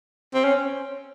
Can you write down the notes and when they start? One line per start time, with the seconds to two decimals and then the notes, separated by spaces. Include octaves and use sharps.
0.34 C4
0.44 C#4